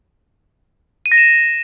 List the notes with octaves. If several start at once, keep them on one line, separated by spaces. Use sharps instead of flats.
D#7
A#6
E7